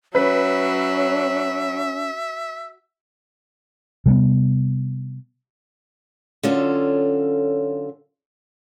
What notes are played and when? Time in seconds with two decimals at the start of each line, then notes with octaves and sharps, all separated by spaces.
0.15 F#3 C#4 B4 E5 B6
4.06 C3 G3 G#3 B3
6.43 D3 F#3 C#4 F4 A4